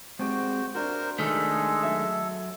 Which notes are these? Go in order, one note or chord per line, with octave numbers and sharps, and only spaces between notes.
G#3 C4 F#4 G4 C5
D4 F#4 A#4 C5
D#3 G#3 A3 A4
F#3 E5